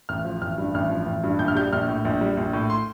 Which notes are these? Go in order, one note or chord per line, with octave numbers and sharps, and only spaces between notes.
A1 F6
F3
A1 F6
G2
A1 F6
F3
A1
G2
A#1 G6
F6
G3 G6
A#1 F6
A2
A#1
G3
A#1
A2
C6